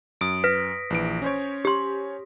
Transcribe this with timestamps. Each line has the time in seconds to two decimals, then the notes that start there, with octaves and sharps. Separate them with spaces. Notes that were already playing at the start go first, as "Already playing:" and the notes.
0.21 F#2 D#6 D7
0.44 B4 A#6 B6
0.90 A#1 E3 D7
1.22 C#4 C5 C#5
1.65 G4 C6